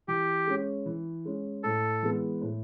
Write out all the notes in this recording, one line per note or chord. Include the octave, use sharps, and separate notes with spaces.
E3 G4
G#3 C#4
E3
G#3 C#4
A2 A4
E3 G#3 B3
A2